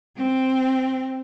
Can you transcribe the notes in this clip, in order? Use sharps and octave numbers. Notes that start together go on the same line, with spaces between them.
C4